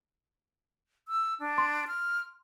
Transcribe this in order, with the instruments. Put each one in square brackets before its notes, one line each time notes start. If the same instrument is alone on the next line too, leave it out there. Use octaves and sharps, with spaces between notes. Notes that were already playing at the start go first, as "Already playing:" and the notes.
[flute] E6
D4
[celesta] C6
[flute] F6